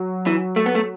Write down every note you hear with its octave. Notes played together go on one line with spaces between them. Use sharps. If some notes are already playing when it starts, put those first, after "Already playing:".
Already playing: F#3
E3
A3
B3
A3